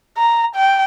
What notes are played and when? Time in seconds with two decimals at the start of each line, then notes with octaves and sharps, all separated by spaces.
0.17 A#5
0.55 G5